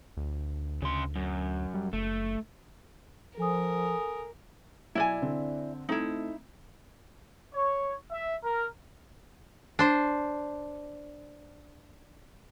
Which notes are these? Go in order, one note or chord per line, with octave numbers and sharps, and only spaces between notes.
D2
D2 C#3 C6
F#2
G3
F#1 A3
F3 A4 A#4 G#5 D#6
B1 E4 D5 G#5
D3 C4
A3 C4 D#4 E4
C#5
E5
A#4
D4 C5